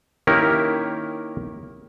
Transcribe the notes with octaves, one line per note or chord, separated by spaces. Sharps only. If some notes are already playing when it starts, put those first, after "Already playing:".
D#3 A#3 C#4 E4 G4 A#4